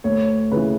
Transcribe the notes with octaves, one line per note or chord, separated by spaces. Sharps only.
D2 C#5
C#3 E3 B4